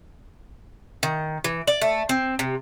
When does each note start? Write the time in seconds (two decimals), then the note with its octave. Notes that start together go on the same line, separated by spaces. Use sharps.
1.03 D#3
1.44 E3
1.67 D5
1.82 A3
2.09 C4
2.39 C3